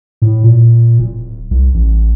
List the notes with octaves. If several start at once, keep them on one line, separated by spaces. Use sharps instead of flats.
A2
A#2
D1
C2
A1